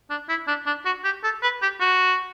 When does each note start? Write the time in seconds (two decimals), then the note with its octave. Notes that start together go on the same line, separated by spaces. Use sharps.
0.10 D4
0.29 E4
0.47 D4
0.66 D4
0.85 F#4
1.04 G4
1.24 A4
1.43 B4
1.62 G4
1.80 F#4